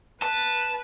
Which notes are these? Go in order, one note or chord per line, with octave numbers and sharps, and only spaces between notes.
B4 A5